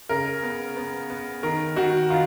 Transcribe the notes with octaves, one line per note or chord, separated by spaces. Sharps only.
C#3 A#4
B3
B3
B3
D#3 A#4
D#3 F#4
D#3 F4